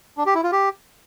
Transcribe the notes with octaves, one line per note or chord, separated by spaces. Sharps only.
D4
G4
E4
F4
G4